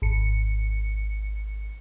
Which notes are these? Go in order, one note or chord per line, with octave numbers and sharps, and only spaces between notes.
G#1 C#7